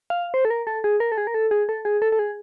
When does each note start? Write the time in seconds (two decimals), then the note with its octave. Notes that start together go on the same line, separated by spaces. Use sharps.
0.10 F5
0.34 C5
0.45 A4
0.50 A#4
0.67 A4
0.84 G#4
1.00 A#4
1.12 A4
1.18 G#4
1.27 A#4
1.34 A4
1.51 G#4
1.69 A4
1.85 G#4
2.02 A4
2.12 A4
2.19 G#4